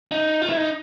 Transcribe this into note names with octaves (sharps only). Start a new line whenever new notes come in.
D#4
F4
E4
D#4